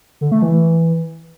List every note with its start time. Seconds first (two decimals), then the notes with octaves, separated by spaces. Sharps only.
0.21 D3
0.32 A3
0.42 E3